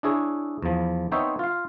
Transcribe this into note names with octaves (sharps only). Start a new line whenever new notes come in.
D4 E4 G#4 C#5
E2 F3
B3 C4 D#4 C5 C#5 E5
F4 F5